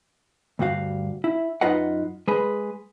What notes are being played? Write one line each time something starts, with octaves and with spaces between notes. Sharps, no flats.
D2 G2 G3 F#4 F5
E4
F#2 D#4 F4 B4 D#5 F#5
G#3 G#4 B4